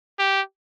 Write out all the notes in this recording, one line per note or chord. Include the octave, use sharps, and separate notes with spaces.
G4